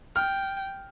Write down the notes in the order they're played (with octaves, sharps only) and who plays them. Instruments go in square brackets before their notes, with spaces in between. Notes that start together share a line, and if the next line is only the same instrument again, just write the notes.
[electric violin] G5 [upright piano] F6